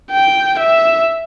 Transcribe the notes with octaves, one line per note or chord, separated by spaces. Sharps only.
G5
E5